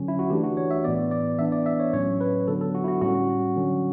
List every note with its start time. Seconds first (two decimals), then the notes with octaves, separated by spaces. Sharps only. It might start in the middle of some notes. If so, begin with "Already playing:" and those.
Already playing: D3 F#3 C#4
0.08 E4
0.19 F#4
0.30 E3 A3 D4 G4
0.44 F#4
0.57 C#5
0.71 E5
0.84 A2 E3 B3 D5
1.11 D5
1.39 E3 B3 D4 E5
1.52 D5
1.66 E5
1.80 C#5
1.93 A2 F#3 C#4 C#5
2.21 B4
2.48 D3 F#3 B3 D4 A4
2.61 A4
2.75 F#4
2.84 E4
2.88 F#4
3.02 A2 G3 C#4 F#4
3.56 D3 F#3 C#4